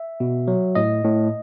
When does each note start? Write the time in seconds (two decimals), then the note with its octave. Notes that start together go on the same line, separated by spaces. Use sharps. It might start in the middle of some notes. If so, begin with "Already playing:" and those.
Already playing: E5
0.20 B2
0.48 F#3
0.75 A2 D#5
1.04 A2